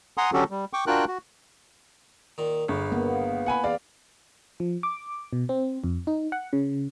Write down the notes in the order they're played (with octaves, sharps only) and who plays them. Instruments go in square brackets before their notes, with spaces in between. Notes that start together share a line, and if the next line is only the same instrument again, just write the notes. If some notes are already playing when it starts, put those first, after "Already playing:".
[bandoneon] F#5 G#5 A#5 C6 D#6
D3 F#3 C#4 F#4 G4 A4
G3
G5 C#6 D6
D4 F4 F#4 A#4 G5 F#6
F#4
[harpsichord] A#2 D#3
[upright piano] G1 [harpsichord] C#3
[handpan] A#3 B3
[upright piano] F#5 G#5 B5
[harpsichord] E2 [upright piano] D5 F5
[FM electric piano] F3
D6
B2
C4
F2
D#4
F#5
C#3